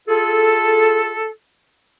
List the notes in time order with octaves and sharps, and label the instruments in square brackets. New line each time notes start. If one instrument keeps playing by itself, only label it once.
[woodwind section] F4 G#4 A4